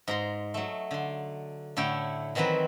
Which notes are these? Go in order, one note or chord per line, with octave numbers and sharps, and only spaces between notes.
G#2 A#5 C6
F#3 A3
D3 C6
A2 D3 E4 C#5 G5
D#3 E3 F#3 C4 B4